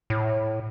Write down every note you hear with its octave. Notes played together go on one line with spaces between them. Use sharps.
A2